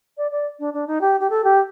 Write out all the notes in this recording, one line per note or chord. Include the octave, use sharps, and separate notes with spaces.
D5
D5
D4
D4
D#4
G4
G4
A4
G4